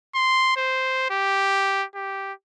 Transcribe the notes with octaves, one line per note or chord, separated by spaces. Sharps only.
C6
C5
G4
G4